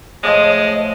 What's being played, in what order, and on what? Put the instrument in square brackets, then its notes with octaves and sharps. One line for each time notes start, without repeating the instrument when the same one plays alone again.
[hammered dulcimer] A2 F3 [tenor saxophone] G#3 [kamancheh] D#5